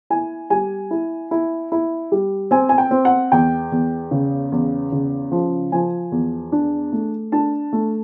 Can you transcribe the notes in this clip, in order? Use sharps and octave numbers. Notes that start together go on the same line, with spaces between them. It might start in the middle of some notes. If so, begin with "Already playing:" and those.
E4 G#5
G3 G#5
E4
E4
E4
G3
C4 G#5
G#5
G5
C4
F#5
E2 G5
E2
C#3
E2
C#3
F3
F3 G#5
E2
D4
A3
D4 A5
A3